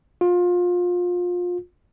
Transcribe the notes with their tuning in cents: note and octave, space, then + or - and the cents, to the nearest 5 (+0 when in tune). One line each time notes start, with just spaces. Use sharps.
F4 +25